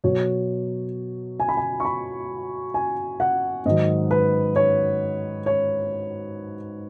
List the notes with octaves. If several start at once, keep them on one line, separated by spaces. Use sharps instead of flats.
B2 F#3 C#5
G#5
B5
G#5
C#6
B5
G#5
F#5
G#2 D#3 F#3 D#5
B4
C#5
C#5